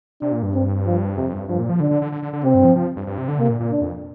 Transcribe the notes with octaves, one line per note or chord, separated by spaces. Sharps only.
C3 D4
A#2
G2
C4
F3
F2 C3
G2
G2 F3
A#2
F3
D3 D4
D3
D3
D3
D3
D3
C3 C4
G2
F3
F3
G2
G2
C3
D3
C3 A#3
A#2
A#2
D4
F2